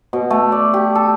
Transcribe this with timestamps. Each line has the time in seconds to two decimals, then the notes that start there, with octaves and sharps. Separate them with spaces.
0.13 B2
0.30 A3
0.52 D5
0.74 G4
0.95 A4